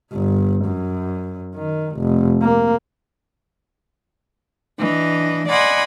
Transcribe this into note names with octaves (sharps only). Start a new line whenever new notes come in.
G1
F#2
D#3
F1
A#3
E3 D4 D#5
D5 D#5 F#5 G#5 B5 C6